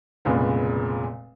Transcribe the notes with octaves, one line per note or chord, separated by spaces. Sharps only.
F1 A#2 C#3 G#3 B3